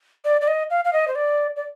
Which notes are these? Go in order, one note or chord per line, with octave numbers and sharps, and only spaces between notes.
D5
D5
D#5
F5
F5
D#5
C5
D5
D5